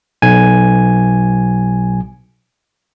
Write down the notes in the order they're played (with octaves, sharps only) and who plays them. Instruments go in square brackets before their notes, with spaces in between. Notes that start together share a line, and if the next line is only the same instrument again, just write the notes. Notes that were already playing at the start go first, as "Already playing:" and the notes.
[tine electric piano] B1 G#5